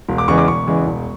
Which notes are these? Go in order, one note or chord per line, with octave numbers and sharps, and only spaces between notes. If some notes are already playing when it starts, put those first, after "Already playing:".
E1
D6
E2 C#3 E3 G#3 C#6
D6
E1 C#6
E2 C#3 E3 G#3
E1